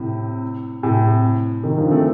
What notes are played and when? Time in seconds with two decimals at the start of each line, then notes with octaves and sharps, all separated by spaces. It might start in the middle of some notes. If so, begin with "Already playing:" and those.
Already playing: A2 C3
0.83 A2 C3
1.63 C3 D#3
1.78 D3 F3
1.91 A3 C4